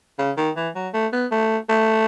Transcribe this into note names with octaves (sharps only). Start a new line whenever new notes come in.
C#3
D#3
E3
F#3
A3
B3
A3
A3